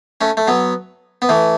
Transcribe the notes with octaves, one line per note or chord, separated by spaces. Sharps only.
A3 C#4
A3
F#3 B3
B3
E3 A3